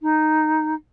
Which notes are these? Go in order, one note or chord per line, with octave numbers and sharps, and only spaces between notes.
D#4